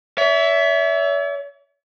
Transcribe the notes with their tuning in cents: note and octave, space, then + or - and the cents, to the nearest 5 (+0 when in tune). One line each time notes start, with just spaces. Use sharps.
C#5 +45 E5 +0